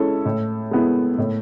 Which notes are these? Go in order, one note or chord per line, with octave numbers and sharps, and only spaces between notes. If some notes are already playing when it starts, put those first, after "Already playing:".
Already playing: G#3 C#4 E4 A4
A2
G#3 B3 E4
A2